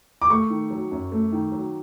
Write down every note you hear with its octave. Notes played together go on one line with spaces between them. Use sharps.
D6
A3 C#6
D#3
F#3
F#2
A3
D#3
F#3